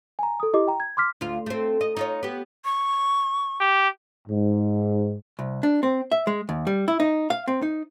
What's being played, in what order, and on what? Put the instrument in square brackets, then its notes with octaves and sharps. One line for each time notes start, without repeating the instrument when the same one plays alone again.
[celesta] G#5 A#5
A4 D#6
E4 G4 D#5 D6
G5 A#5
G#6
C6 D6 F6 B6
[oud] D2 F4
A3 C4
D#5
D#4 F4 C#5
B3 G4
[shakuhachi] C#6
[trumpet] G4
[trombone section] G#2
[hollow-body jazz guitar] C2
D4
C4
E5
G#3
D#2
G3
E4
D#4
F5
C4
D#4